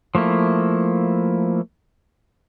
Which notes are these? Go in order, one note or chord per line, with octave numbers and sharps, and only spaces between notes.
F3 A3 A#3 E4